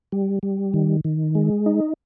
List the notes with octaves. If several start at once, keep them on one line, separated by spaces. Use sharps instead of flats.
G3
G3
D#3
D#3
G#3
D#4